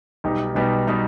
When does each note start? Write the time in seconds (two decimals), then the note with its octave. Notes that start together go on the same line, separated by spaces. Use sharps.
0.24 B1 B2 G3 D#4 G4
0.55 B1 B2 G3 D#4 G4
0.87 B2 G3 D#4 G4